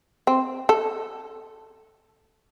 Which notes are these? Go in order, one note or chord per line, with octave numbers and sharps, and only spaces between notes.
C4
A4